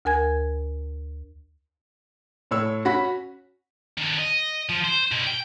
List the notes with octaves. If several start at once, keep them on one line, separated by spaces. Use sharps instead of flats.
D2 A#4 G#5 G#6
A2 C#5 E6
C#4 F#4 F#5 B5 B6
D#3 D4
D#5
F3
C5
B2 G3
G5